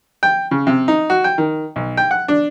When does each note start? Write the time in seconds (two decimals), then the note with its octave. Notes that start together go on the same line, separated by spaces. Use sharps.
0.23 G5
0.51 C#3
0.67 C3
0.88 D#4
1.10 F#4
1.24 G5
1.38 D#3
1.76 B1
1.97 G5
2.11 F#5
2.28 D4